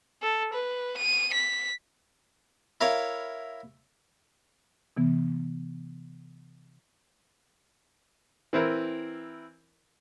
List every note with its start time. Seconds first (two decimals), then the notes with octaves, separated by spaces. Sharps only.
0.23 A4
0.53 B4
0.97 D#7
1.33 B6
2.81 E4 A#4 C#5 F5
4.97 C3 E3 B3
8.53 E3 C4 E4 A#4